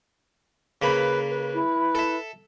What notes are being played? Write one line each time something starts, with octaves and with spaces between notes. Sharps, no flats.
C#3 A#3 B4 B5
B4
E4
A4 E5